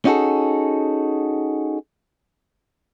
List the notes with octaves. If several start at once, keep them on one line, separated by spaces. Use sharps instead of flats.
C#4 D#4 F#4 G#4 A4